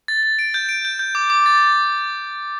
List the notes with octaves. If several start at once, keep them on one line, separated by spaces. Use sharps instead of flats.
A6
A6
D7
G6
D7
G6
G6
D6
D6
A6